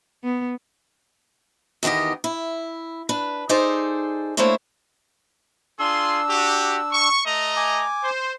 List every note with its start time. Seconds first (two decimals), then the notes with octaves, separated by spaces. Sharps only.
0.24 B3
1.83 E2 D#3 B3 G4 D#5
2.24 E4
3.09 D4 B4
3.49 D#4 G#4 A4 C5 D5
4.37 A3 A#3 D4 E4 C5 C#5
5.79 D4 F4 G#4 C6 E6
6.28 F#4 G4
6.92 C#6
7.26 A3 D#5 A#5
7.56 G#5 D6
8.03 C5